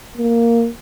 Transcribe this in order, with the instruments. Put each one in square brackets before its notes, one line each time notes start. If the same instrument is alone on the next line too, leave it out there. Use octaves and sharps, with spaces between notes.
[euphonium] A#3